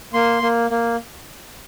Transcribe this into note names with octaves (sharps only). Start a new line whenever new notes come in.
A#3 C6
A#3
A#3